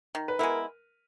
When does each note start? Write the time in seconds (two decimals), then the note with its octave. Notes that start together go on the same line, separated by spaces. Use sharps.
0.15 D#3
0.28 B4
0.39 G#3 B3 E4 A#4